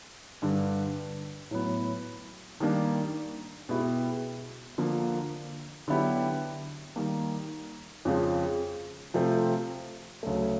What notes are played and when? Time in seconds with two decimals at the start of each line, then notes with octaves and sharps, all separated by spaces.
0.42 G2 D3 G3
1.51 A2 F#3 B3
2.60 D#3 G3 A#3 D4
3.69 B2 G#3 B3 E4 G4
4.78 D3 F3 A#3
5.88 D3 F#3 B3 E4 G4
6.96 D#3 G3 A#3
8.05 F2 C#3 F3 G#3
9.14 C3 F3 A3 C4
10.23 D2 C#3 F#3 A3